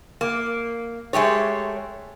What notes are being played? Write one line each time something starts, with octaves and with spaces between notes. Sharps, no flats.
A#3
G#3 A3 G4 C#5